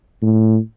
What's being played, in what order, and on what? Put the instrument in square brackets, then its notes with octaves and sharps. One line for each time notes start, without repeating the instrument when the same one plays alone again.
[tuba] A2